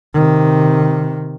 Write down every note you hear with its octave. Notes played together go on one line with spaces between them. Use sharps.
C3 D#3